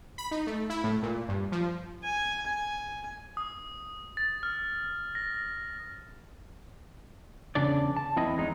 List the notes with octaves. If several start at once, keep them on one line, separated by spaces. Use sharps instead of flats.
B5
D#4
A3
E4
A2
A#2
G2
F3
G#5
G#5
D#6
A6
F6
A#6
E2 C#3 D4 D5
A5
E2 C4 E4 D#5
E2 G#3 D#4